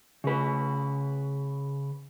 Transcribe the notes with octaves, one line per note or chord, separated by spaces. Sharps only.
C#3 B4